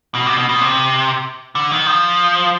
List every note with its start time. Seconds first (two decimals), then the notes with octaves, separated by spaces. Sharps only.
0.15 B2
0.26 C3
0.38 B2
0.49 B2
0.61 C3
1.55 D3
1.71 D#3
1.86 F3